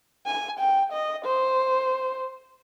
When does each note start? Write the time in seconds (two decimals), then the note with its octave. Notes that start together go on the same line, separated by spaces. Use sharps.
0.26 G#5
0.59 G5
0.93 D#5
1.25 C5